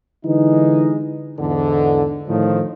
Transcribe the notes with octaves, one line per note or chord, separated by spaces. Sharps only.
D3 E3 G#3 D#4
E2 G#2 D3
A2 D#3 F3